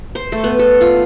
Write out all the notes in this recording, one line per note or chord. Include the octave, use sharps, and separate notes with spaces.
C5
A3
B3
A4
F4